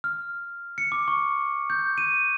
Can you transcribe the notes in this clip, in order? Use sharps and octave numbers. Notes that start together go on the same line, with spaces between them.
F6
C#7
D6
C#6
G6
D#7